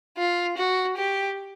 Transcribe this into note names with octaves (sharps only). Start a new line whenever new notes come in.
F4
F#4
G4